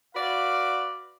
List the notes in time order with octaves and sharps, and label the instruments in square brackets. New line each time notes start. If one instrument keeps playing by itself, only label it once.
[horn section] F#4 B4 D5 F5